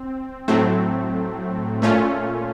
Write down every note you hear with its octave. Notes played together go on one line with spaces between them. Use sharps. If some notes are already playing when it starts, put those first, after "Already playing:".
Already playing: C4
A2 F#3 A3 C4
A#2 A3 C#4 F4